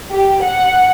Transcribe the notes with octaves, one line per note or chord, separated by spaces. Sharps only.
G4
F#5